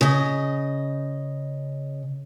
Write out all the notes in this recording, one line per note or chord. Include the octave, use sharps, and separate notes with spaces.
C#3 D#5